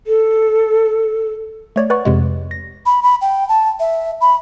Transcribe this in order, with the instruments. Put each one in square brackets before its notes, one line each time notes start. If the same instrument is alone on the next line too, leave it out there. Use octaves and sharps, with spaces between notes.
[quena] A4
[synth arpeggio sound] A3 C#5 D5
B4 D5 F#5 C#6
F2 C3 G#3
A#6
[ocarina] B5
B5
G5
A5
E5
B5